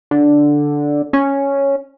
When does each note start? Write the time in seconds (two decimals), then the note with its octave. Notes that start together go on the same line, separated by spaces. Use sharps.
0.11 D3
1.13 C#4